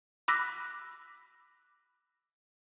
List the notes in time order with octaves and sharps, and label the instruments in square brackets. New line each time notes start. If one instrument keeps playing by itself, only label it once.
[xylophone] B5 D6 E6 F#6 A#6 B6